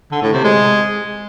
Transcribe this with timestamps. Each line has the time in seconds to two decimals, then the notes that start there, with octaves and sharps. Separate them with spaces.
0.12 D3
0.22 A2
0.33 C3
0.44 G#3